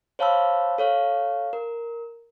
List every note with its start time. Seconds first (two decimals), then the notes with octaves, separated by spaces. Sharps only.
0.19 C5 C#5 F5 A5 B5 E6
0.78 A4 C#5 F5
1.53 A#4